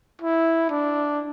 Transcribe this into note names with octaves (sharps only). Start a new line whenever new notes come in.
E4
D4